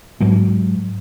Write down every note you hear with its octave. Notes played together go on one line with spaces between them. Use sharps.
G#2 F#3 G#3